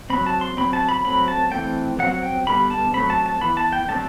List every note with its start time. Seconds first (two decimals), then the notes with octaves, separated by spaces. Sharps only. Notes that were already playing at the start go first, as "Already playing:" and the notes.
0.10 F#3 C4 B5
0.27 A5
0.41 C6
0.57 F#3 C4 B5
0.73 A5
0.89 B5
1.04 F#3 A3 C4 B5
1.28 A5
1.52 E3 A3 C4 G5
1.99 F#3 C4 F#5
2.23 G5
2.47 D3 G3 B3 B5
2.71 A5
2.94 F#3 A3 C4 B5
3.10 A5
3.26 A5
3.41 E3 B3 B5
3.57 A5
3.73 G5
3.88 D3 F#3 A3 C4 A5